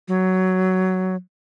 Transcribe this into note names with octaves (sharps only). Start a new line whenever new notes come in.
F#3